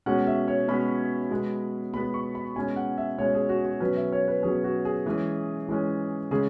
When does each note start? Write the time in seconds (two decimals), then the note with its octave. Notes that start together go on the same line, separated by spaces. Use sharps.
0.06 B2 G#3 C#4 F#5
0.27 E5
0.48 C#5
0.68 B2 G#3 C#4 B5
1.31 B2 G#3 B3
1.93 B2 G#3 B3 B5
2.14 C#6
2.35 B5
2.56 B2 G#3 C#4 G#5
2.76 F#5
2.98 E5
3.18 B2 G#3 C#4 C#5
3.34 G#4
3.49 F#4
3.65 F#4
3.80 B2 F#3 C#4 B4
3.96 E5
4.12 C#5
4.28 B4
4.43 B2 F#3 C#4 G#4
4.64 F#4
4.85 G#4
5.06 E3 G#3 C#4
5.68 E3 G#3 C#4
6.31 C#3 G#3 C#4 G#4